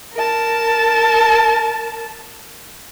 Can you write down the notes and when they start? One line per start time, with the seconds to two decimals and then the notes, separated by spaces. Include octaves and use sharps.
0.14 A#4 A5